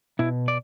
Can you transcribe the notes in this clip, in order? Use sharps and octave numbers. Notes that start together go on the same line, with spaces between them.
B2 E4
D5